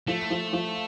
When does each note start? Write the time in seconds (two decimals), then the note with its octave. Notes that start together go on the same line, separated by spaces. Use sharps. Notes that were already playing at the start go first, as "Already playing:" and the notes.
0.07 F3 A3
0.30 F3
0.53 F3